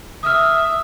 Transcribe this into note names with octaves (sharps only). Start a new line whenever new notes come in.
E5 D#6 F6